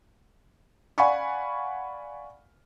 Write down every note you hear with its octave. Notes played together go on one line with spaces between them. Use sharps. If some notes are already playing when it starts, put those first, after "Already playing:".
D5 F5 F#5 G#5 B5 C#6